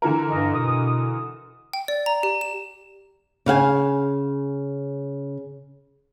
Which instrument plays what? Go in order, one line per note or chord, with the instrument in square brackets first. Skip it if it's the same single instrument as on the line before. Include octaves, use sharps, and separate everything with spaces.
[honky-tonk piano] D3 E3 A#4
[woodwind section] G2 D#5
B2 D#6
[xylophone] G5
D5
A#5
G4
E7
[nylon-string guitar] C#3 F5 F#5 G#5